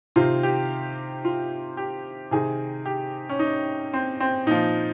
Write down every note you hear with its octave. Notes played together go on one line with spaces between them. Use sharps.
C3 D#3 F4
G4
F4
G4
C3 D#3 G#4
G4
C#4
D#4
C4
C4
A#2 F3 D#4